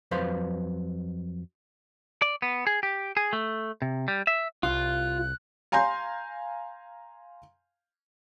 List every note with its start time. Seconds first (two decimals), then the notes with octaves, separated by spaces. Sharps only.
0.11 F2 F#3 B4 C5 F5 C6
2.22 D5
2.42 B3
2.67 G#4
2.83 G4
3.17 G#4
3.33 A3
3.82 C3
4.08 G3
4.27 E5
4.63 C2 F4 F#6
5.72 F5 G#5 A#5 C6 G6